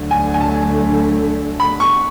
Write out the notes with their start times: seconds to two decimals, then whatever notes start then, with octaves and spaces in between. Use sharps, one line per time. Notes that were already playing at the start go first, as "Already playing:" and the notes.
Already playing: D2 D3 F#3 A3
0.11 G#5
0.34 G#5
0.41 A5
1.60 B5
1.80 C#6